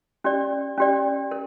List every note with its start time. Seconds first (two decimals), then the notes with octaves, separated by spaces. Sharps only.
0.24 C#4 G4 D5
0.78 C#4 G4 D5
1.31 A#4